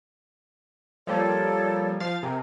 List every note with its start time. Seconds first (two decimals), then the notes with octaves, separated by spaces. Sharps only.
1.07 F3 G3 A#3 A4 C#5 D5
2.00 F3 F5 A6
2.23 C3 A#4 G#5